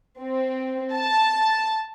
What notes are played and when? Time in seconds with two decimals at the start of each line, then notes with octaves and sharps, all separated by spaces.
0.21 C4
0.94 A5